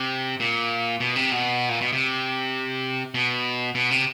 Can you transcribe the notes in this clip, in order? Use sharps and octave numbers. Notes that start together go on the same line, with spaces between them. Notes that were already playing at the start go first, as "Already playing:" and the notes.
Already playing: C3
A#2
B2
C3
B2
A#2
B2
C3
B2
B2
C3